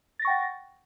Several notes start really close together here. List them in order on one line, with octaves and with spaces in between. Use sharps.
A6 A#6 C#6 G5 F#5